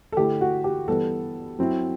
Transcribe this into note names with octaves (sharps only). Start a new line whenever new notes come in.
A4
D3 A3 E4 G4
F#4
G4
E3 G3 B3 A4
F#3 C4 E4